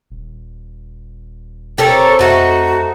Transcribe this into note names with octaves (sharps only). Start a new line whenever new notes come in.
D#1
C4 G4 A4 A#4 C#5
F2 A3 D#4 F#4 A4